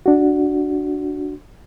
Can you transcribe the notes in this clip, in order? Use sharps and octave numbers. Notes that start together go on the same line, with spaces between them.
D4 F#4